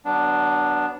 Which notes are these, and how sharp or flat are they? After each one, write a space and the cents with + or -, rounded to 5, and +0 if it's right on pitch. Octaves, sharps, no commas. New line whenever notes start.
F#3 +35 B3 +0 D4 +0